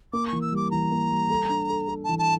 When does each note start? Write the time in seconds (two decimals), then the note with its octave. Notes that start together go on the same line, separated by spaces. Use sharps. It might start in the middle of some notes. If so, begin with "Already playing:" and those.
0.13 A#3 D6
0.27 C#6
0.33 E3
0.41 E6
0.52 G3 D6
0.71 E3 A#5
0.91 A#3
1.10 G3
1.30 A4
1.49 D4
1.70 A4
1.88 A4
2.04 A5
2.09 E3
2.19 A5